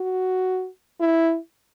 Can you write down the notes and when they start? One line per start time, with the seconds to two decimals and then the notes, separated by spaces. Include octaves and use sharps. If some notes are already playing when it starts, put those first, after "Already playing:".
Already playing: F#4
1.00 E4